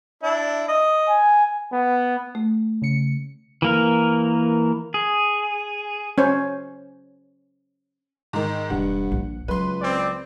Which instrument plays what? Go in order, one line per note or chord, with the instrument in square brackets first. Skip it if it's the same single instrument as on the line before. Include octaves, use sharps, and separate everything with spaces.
[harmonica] D4 E4
D#5
[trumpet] G#5
[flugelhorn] B3
[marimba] A3
[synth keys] C#3 C#7
[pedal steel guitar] E3 A#3 A#4
G#4
[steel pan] C#4 C5 C#5
[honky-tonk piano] G#2 D#3
[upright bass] E1 [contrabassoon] G2 [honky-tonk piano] F#5
[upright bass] A#1
[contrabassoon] C#2 [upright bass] F#3 [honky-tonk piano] B4 C6
[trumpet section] C4 D5